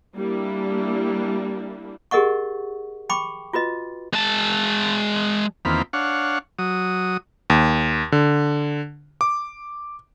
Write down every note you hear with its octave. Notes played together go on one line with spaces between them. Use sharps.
G3 A#3 D4 E4
G4 G#4 A#4 D#5 F#5 C#6
G5 B5 C#6 D6
F4 F#4 B4 D#5
G#3 A5
E2 D#3 A#3 C4 F4 B5
D4 C#5 F5 F#5
F#3 D#6
D#2
D3
D6